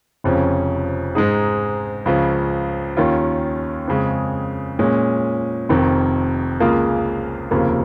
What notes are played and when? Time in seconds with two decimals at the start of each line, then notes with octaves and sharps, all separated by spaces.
0.24 F1 F2 C#3 F3 C#4
1.15 G#2 G#3 D#4 G#4
2.06 C#2 C#3 F3
2.97 D#2 D#3 C#4 F4
3.88 F2 C#3 G#3
4.79 A#2 G#3 C#4
5.69 F1 F2 D#3
6.60 C#2 C#3 A#3 F4 G#4
7.51 F1 D#2 C#3 F3 A#3